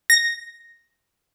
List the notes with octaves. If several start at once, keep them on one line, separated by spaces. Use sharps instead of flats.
A#6